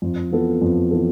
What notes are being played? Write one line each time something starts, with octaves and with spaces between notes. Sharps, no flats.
F2
E3 B3 F4 A4
F2
E3 B3 F4 A4